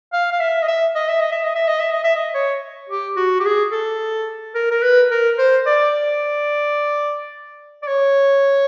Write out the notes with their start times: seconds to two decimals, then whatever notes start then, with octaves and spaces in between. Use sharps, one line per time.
0.13 F5
0.32 F5
0.40 E5
0.62 D#5
0.68 E5
0.95 D#5
1.08 E5
1.20 D#5
1.32 E5
1.44 D#5
1.55 E5
1.67 D#5
1.79 E5
1.91 D#5
2.04 E5
2.15 D#5
2.35 C#5
2.89 G4
3.16 F#4
3.40 G4
3.45 G#4
3.72 A4
4.55 A#4
4.71 A#4
4.83 B4
5.11 A#4
5.38 C5
5.66 D5
7.82 D5
7.87 C#5